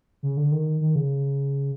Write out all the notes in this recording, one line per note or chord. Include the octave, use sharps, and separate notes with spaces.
C#3
D3
D#3
D#3
C#3